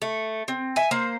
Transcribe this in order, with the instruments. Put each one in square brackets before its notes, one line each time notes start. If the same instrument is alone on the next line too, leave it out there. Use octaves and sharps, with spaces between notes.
[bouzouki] A3
C4
E5 G#5
A#3 C5